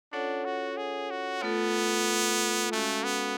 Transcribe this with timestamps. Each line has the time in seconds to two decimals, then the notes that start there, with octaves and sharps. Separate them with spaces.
0.12 C#4 D4 F4 A4 C#5 F#5
0.45 F#4
0.77 G#4
1.10 F#4
1.42 A3 B3 F4 A4
2.72 G#3 A3 C#4 F#4 A4 F5
3.04 B3